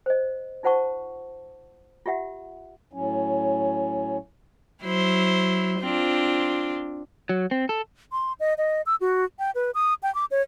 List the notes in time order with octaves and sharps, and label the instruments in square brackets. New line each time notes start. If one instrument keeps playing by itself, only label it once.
[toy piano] C5 D#5
D#4 F4 C5 F#5 A5 C#6
F4 G4 E5 F#5
[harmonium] A2 F#3 C#4
[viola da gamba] F#3 E4 C5
C4 D4 F4
[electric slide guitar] F#3
C4
A4
[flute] C6
D#5
D#5
E6
F#4
G5
B4
D#6
G5
D6
C#5